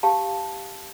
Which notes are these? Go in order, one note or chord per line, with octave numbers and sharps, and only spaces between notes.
G4 F5 A5